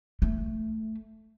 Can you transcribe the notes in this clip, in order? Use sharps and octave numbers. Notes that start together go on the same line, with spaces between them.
A3